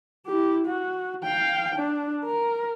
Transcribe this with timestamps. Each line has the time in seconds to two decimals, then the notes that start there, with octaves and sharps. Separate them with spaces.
0.26 E4 G4
0.66 F#4
1.24 F5 G5
1.76 D4
2.25 A#4